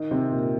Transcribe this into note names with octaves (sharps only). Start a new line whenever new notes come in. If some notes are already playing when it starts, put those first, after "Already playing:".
Already playing: D#3 D#4
C3 C4
A#2 A#3